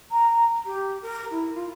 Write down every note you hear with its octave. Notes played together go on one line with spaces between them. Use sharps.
A#5
G4
A#4
E4
F4